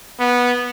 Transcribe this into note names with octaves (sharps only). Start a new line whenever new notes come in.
B3